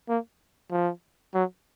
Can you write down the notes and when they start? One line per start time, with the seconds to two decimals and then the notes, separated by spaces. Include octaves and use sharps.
0.09 A#3
0.71 F3
1.34 F#3